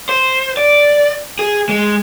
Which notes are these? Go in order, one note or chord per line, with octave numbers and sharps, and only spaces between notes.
C5
D5
G#4
G#3